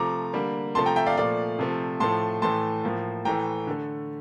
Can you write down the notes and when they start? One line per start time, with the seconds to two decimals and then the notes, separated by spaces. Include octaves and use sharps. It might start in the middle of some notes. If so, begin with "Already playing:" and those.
Already playing: C3 F3 A3 A#5 D6
0.33 D3 G3 A#3
0.75 C3 F3 A3 A5 C6
0.86 G5 A#5
0.96 E5 G5
1.06 D5 F5
1.17 A#2 F3 A3 D5 F5
1.59 C3 F3 A3
2.00 A2 F3 A3 A5 C6
2.42 A2 E3 A3 A5 C6
2.84 A2 F3 A#3
3.25 A2 E3 A3 G5 A#5
3.67 D3 A3